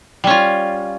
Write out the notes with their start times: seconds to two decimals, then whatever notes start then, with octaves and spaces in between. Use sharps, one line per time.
0.24 G3
0.27 C#4
0.30 F4